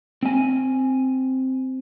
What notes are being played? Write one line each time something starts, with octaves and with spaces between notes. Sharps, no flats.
C4 G#5